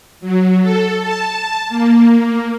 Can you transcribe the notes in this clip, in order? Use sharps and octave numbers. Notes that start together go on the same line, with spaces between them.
F#3
A4
A5
A#3